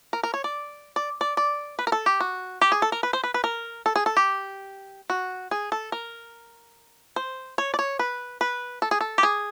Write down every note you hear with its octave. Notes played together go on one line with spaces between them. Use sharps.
A#4
A#4
C#5
D5
D5
D5
D5
B4
A#4
A4
G4
F#4
G4
G#4
A4
A#4
B4
C5
B4
B4
A#4
A4
G#4
A4
G4
F#4
G#4
A4
A#4
C5
C#5
D5
C#5
B4
B4
A4
G#4
A4
G4
G#4